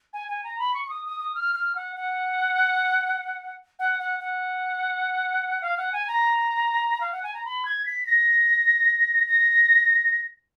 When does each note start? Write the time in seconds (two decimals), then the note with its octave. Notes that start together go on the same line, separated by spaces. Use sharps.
0.13 G#5
0.28 G#5
0.44 A#5
0.59 B5
0.74 C#6
0.85 C#6
0.90 D#6
1.05 D#6
1.20 D#6
1.35 F6
1.55 F6
1.75 F#5
1.96 F#5
3.79 F#5
4.00 F#5
4.20 F#5
5.62 F5
5.77 F#5
5.93 G#5
6.08 A#5
7.01 F5
7.12 F#5
7.23 G#5
7.34 A#5
7.45 B5
7.65 G#6
7.86 B6
8.07 A#6
9.28 A#6